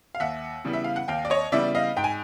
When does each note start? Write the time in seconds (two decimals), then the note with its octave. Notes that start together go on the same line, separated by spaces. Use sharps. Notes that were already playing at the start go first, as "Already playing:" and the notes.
0.15 F5
0.20 D#2 E5 F#5
0.65 C#3 E3 G3 B3
0.73 E5
0.84 F5
0.96 F#5
1.08 D#2 F5 G5
1.25 D5
1.30 C#5 D#5
1.52 C#3 E3 G3 B3 D5 E5
1.75 D#5 F5
1.97 G#2 G5
2.04 G#5